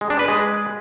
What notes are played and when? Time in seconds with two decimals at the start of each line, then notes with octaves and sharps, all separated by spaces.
0.01 G#3
0.10 D4
0.19 B4
0.28 G#3